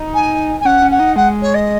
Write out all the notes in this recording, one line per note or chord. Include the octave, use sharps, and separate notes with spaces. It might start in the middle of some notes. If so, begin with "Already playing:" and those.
Already playing: D#4
G#5
G#5
C#4 F#5
C#4
F#5
D#4
G#3 F#5
C#5
D#5